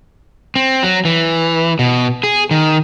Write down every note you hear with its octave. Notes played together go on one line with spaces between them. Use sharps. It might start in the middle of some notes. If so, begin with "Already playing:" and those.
C4
F#3
E3
B2
G#4
D#3